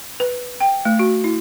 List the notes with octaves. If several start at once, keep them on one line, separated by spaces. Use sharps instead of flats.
B4
G5
A3
F#4
E4